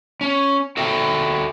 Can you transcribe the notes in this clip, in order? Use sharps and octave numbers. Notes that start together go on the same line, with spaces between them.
C#4
F#4 A4 E5 G5